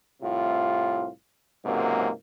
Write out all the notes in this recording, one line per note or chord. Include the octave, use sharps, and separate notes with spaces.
C2 A2 C3 F4
C#2 G#2 C3 F#3 A#3